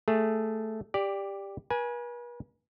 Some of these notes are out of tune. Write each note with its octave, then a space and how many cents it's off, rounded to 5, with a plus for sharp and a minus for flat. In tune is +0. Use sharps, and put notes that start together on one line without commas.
A3 +0 G#4 +0
G4 +15 D5 +0
B4 -45 G#5 +5